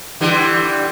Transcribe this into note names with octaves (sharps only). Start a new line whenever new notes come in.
D3 E3 G3